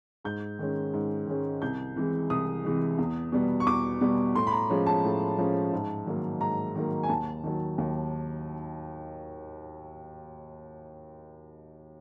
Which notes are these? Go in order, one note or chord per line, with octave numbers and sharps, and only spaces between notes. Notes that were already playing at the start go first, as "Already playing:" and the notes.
G#2 G6
D#3 G#3 C#4
G#2
D#3 G#3 C#4
C2 G6
C3 E3 G#3
C2 D#6
C3 E3 G#3
E2
B2 G3 B3
C#6
E2 D6
B2 G3 B3
A2 C6
B5
A#5
F3 G#3 C#4
A5
A2
F3 G#3 C#4
G#2
D#3 F#3 A#3
G#2 A#5
D#3 F#3 A#3
G#5
D#2 A5
D#3 F#3
D#2